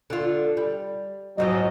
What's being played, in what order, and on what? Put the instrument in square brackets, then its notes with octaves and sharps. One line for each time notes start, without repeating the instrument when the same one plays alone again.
[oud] D3 F4
G3
[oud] F2 G#2 F3 [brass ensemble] F#3 D#5